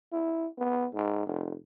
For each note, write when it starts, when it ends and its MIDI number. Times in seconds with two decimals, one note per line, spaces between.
0.13 0.47 64
0.58 0.87 59
0.94 1.24 44
1.26 1.55 29